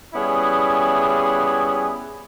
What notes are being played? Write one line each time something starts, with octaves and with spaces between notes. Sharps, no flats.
G3 B3 C#4 E4 G#4